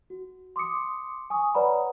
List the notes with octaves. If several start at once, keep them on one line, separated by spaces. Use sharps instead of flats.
F#4
C6 D6 D#6 C#7
G#5 C#6 D#6
B4 C#5 D5 F#5 A#5 B5